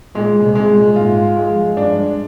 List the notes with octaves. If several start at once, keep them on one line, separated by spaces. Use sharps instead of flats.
A#2 G#3
C2 C3
G#3
A#2
G#2 F4
G#3
F2
G2 D4